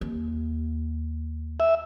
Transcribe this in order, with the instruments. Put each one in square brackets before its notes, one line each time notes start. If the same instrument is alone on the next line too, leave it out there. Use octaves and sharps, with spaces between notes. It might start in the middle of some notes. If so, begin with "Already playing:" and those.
[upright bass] D#2
[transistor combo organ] E5